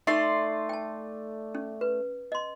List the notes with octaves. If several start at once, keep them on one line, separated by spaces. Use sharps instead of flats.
A3 D#4 D5 C6
G5 A5
C#4
B4
D#5 C6